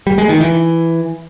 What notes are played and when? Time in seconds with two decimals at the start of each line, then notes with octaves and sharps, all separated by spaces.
0.07 G3
0.18 G#3
0.29 D#3
0.41 E3